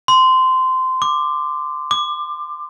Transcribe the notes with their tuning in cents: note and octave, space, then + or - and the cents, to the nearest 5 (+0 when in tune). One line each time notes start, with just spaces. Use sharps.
C6 -20
D6 +10
D6 +25